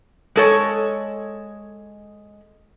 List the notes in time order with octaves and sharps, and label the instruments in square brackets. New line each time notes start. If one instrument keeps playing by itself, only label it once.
[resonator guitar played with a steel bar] G#3 A4 C#5